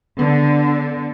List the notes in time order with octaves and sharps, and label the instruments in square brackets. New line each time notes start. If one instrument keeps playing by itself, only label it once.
[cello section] D3 [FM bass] B3